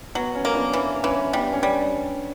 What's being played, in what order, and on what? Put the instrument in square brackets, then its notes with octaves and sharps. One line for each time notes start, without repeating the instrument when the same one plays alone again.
[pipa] F#3 [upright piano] B3
[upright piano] C#4
[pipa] A#3
[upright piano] B3 D4
[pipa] E3 [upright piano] C#4
[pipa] E3 [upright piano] C#4
[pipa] G3 [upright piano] B3 D4
[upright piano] C#4
[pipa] G3